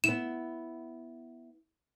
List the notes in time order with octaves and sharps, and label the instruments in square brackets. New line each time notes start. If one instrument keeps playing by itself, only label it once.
[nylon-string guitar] B3 E4 [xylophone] E7